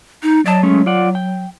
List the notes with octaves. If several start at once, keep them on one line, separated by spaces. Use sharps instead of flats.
D#4
F#3 D5 D#5 A5
G#3 A3 C#4
F4 D5 F#5
G5